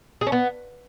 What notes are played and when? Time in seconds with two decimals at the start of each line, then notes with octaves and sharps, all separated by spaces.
0.21 G#4
0.27 C#4
0.32 B3